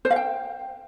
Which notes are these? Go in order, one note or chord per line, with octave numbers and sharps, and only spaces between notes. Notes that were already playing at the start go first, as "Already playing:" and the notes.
C5
F5
G5